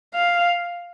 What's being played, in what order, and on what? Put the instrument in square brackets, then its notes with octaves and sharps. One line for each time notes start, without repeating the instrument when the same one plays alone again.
[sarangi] F5